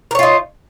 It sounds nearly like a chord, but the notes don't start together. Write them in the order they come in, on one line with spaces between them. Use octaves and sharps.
A#4 C#5 F4 D#4